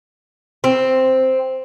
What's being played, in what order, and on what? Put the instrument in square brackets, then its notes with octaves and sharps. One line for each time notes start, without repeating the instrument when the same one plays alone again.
[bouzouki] C4